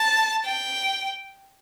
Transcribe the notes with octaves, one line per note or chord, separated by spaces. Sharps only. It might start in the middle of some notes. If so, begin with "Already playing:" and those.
Already playing: A5
G5